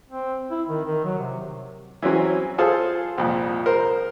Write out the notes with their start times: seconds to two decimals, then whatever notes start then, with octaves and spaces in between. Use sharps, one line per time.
0.09 C4
0.50 E4
0.68 D#3
0.85 D#3
1.04 F#3
1.18 C3
2.02 E3 F#3 C4 C#4
2.58 F4 G#4 A4 C5 F5 A5
3.18 C2 F2 A#2
3.66 A#4 C5